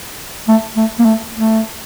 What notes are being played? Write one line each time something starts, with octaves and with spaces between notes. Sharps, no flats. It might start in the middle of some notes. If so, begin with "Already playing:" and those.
A3
A3
A#3
A3
A3